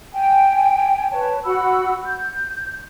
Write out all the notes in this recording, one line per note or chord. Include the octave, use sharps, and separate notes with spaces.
G5 G#5
B4 C#5 A5
F#4 F#5 B5 E6
G6